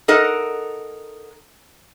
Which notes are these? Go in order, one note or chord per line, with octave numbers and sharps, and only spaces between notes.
D#4 A4 A#4 F#5